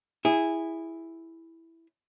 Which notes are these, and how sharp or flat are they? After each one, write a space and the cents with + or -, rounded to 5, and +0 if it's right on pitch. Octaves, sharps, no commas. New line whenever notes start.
E4 +0 G#4 -15